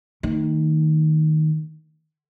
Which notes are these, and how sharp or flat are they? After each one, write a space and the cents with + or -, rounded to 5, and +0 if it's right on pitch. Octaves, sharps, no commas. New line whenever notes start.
D#3 +0 A3 +45